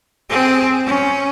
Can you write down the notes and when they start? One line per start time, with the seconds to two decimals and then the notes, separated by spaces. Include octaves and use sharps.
0.30 C4 G#4
0.86 C#4